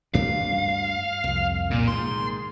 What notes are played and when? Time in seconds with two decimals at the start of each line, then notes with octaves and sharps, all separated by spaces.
0.14 D2 G2 D4 F5
1.24 C2 F2
1.71 A#2
1.88 G#2 D#3 C6